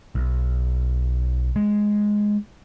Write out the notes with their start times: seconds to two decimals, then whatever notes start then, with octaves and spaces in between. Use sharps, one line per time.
0.15 B1
1.56 G#3